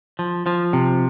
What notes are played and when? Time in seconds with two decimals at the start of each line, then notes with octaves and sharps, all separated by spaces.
0.19 F3
0.46 F3
0.73 C3